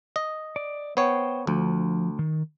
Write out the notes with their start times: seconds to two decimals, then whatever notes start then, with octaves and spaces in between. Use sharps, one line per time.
0.16 D#5
0.56 D5
0.97 B3 C5 C#5 G5
1.47 D2 F3
2.19 D#3